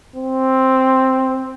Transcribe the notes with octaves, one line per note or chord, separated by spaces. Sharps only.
C4